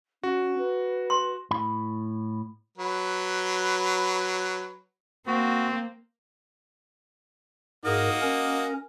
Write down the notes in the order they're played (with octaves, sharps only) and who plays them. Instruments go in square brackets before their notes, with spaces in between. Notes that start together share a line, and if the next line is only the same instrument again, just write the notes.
[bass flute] C#4 [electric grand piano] F#4
[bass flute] B4
[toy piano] C6
[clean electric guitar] A2 B5
[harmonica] F#3 B4
[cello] A#3 [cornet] C4 [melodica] F#4
[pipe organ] G#2 G#4 A#4 [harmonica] A#3 F#4 D#5
[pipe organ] C#4 A#4